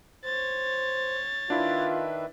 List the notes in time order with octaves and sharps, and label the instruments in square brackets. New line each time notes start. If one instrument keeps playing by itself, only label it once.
[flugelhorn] C5 [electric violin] C#5 A6
[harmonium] D#3 B4 E5 [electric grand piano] D4 E4 [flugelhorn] F4